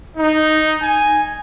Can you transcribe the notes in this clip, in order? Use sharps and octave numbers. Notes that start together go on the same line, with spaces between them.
D#4
G#5